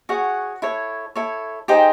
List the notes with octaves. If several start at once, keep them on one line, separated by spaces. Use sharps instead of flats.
F#4 G#4 C#5 F#5
E4 A4 C#5
E4 A4 C#5
D#4 G4 G#4 C5 G5